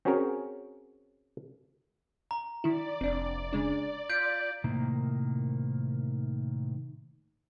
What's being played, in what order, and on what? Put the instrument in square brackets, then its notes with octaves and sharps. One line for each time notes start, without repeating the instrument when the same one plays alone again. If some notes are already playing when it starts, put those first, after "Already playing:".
[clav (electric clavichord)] C4 C#4 F#4 G#4 A#4 C#5
[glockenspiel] A#5
[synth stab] D#3 E4 [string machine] D5
[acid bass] F1 [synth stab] C4 D4
[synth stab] C#3 G#3 D4
[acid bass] F4 [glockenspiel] G6 D7 [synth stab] B6
[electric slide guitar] A2 C3 D#3 A#3